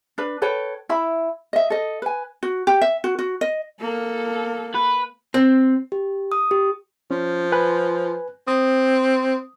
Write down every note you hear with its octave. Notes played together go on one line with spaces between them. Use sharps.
D4 B4
A4 B4 C#5 G5
E4 E5 B5
D#5 E5
A4 D#5
B4 G#5
F#4
G4
E5
F#4
F#4
D#5
A#3 A4
B4
C4
G4
D#6
G4
F3 C#4
B4 G#5 F#6
C4 D#6